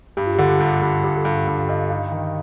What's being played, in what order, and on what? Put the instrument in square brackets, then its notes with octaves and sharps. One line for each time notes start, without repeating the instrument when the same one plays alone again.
[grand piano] G2 [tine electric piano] G4
[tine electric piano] F4
[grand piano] D3 [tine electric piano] G4
[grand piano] G2
G2
[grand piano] G2 [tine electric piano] G4
[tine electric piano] A4
[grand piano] G2 [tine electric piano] G4
[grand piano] G2 [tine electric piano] F5
[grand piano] G2 [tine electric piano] D#5
[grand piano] D#4 [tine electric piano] F5
[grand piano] D#3